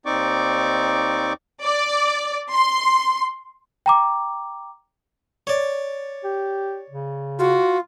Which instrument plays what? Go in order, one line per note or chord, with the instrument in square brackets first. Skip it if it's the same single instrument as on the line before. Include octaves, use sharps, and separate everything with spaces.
[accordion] D#2 C4 D#4 D5 C#6 D6
[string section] D5
C6
[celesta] G5 A#5 D6
[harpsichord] C#5 D5
[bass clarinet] G4
C#3
[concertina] F4 [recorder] F#4